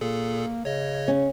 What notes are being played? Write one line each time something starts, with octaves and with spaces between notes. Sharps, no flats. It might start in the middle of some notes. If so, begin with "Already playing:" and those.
A#2 A#3 G#4 A4
C#3 C#5 D#5
C#4